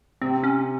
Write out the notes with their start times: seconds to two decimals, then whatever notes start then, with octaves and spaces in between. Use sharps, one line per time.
0.22 C3 C4
0.43 C#4